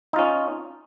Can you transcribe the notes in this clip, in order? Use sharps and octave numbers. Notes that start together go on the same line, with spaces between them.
C#4 D#4 F4